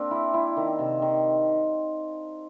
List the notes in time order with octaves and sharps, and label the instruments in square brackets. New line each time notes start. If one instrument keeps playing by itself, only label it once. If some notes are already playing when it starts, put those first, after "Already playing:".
Already playing: [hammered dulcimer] A#3 C4 D4 G4
E4
E4
D#3
C3
D#3